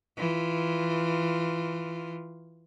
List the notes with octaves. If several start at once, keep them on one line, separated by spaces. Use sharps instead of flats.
E3 F4